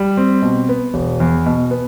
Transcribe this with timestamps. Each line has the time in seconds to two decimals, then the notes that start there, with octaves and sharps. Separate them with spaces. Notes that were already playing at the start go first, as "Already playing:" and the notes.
Already playing: G3
0.17 C4
0.42 B2
0.69 B3
0.94 E1
1.20 E2
1.46 B2
1.71 B3